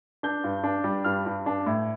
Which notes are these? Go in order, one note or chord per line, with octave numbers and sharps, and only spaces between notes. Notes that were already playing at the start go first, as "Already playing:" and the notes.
D4 G6
G2
D4
G3
G2 F6
G2
D4
A2